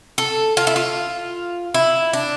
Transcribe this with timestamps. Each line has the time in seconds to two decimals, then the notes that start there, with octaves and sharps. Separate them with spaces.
0.18 A4
0.57 F4
0.67 E4
0.76 F4
1.74 E4
2.13 D4